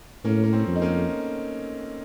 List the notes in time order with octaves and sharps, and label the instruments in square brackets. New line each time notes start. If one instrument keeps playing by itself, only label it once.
[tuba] A2 [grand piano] A#3 C#4
[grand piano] A#3
A3 C4
[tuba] F2
[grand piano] D#4
A#3 C#4